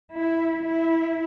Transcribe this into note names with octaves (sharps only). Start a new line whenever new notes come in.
E4
E4